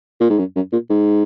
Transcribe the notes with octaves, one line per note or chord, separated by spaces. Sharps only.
A#2
G#2
F#2
F#2
A#2
G#2